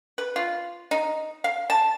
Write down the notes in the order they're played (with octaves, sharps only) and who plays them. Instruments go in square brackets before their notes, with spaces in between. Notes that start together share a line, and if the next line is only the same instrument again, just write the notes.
[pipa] B4
F4
D#4
F5
A5